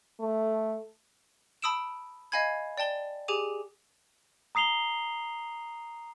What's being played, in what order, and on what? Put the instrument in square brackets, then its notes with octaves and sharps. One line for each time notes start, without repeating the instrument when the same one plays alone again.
[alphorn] A3
[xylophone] A5 B5 D#6 E6 D7 E7
D#5 F5 G#5 B5 G#6
D5 G5 A5 G7
G4 G#4 G#5 D6 D#7
[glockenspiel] A#5 D#6 C7 F7 G7